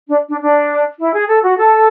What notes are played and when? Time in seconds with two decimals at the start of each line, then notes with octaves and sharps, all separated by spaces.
0.09 D4
0.28 D4
0.43 D4
0.99 E4
1.13 G#4
1.28 A4
1.43 F#4
1.58 A4